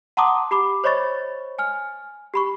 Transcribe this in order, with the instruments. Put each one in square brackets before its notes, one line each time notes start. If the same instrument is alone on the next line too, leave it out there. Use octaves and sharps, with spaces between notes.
[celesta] F#5 A5 A#5 C6 D6 D#6
G4 B5 D6
C5 C#5 D#5 B5 C#6 A6
G#5 F6
G4 B5 C#6